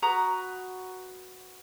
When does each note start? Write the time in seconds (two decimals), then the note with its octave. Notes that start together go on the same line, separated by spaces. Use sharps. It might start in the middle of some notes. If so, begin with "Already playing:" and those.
0.02 F#4 B4 A#5 D#6